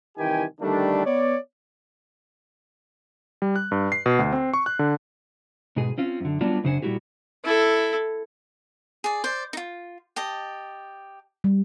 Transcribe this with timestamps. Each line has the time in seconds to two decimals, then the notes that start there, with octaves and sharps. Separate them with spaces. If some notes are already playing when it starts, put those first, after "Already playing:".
0.18 C2 D#3 E3 G4 G5 G#5
0.61 D3 D#3 G3 A3 D4
1.05 B3 C#5 D5
3.42 G3
3.56 F#6
3.72 G2
3.92 C7
4.06 B2
4.19 D2
4.33 C4
4.54 C#6
4.66 F#6
4.79 D3
5.76 G#2 B2 G#4
5.98 C4 C#4 F4
6.20 F#2 D3
6.41 F#3 G3 B3 D4 F4
6.64 F#2 C#3 D4 C5 F#5 G#5
6.82 A#2 G3 G#3 E4 F#4 G4
7.45 E4 A4
9.04 G#4 D5
9.24 C5 D5
9.53 D#4 F4
10.16 G4 D#5 A5
11.44 G3